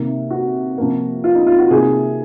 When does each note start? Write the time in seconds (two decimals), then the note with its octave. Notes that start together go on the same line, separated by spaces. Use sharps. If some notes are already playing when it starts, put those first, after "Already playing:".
Already playing: C3 D#3 A#3
0.30 F#4
0.78 C3 F3 A#3
1.24 F4
1.35 D#4
1.47 F4
1.58 F#4
1.70 C3 D#3 A#3 G#4